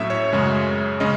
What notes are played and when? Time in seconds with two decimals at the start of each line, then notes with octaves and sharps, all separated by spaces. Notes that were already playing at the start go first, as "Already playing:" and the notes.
Already playing: A2 F#3 A3 C#4 E5
0.10 C#5
0.33 F#2 C#3 G#3
1.00 C#3 G#3 C#4 D#5